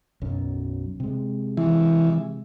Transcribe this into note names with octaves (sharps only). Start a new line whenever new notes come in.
B1 F#2
C3 G#3
E3